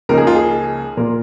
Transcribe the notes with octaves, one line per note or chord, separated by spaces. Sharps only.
C#2 C#3 F3 A#3 D#4 A#4
G#4
F4
G#4
A#2 A#3 F4 A#4